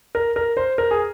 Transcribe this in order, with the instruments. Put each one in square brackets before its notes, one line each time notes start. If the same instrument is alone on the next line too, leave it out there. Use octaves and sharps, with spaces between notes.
[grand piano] A#4
A#4
C5
A#4
G#4